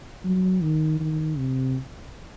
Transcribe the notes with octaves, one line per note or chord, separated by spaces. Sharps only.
F#3
D#3
D#3
C3